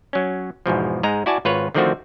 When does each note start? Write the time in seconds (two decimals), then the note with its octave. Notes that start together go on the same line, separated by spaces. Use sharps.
0.13 F#3 C#4
0.66 E2 G#2 B2 F3
1.03 G#2 G#3 D#5 A#5
1.26 E4 F#4 D5 G#5 A5
1.45 G#1 F4 B4 C#5
1.75 D3 D#3 F3 A3 C4 F#4